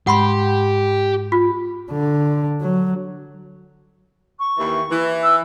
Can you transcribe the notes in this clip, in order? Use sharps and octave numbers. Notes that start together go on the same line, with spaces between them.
G#2 G4 F#5 B5 C6
F4
D3
F#3
C#6
D#2 E3
E3
E6